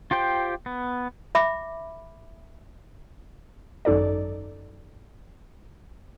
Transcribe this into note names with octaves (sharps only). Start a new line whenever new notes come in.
F4 G4 C5 G5
B3
E5 B5 D6
G#1 F#2 D#4 A4 D5